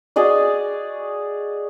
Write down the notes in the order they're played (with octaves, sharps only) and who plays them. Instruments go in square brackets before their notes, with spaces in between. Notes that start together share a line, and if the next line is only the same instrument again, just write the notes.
[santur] F#4 G#4 D5 D#5